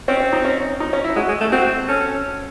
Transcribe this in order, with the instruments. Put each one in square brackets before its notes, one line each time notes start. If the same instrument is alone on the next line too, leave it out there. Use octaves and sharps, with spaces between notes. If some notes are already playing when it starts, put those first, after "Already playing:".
[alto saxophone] C4 [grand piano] C#4
[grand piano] C#4
D#4
C#4
D#4
C#4
E4
[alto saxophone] G#3 [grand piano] F#4
[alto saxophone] G#3
A3
[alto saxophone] C4 [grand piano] F#4
[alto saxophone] C#4 [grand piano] A4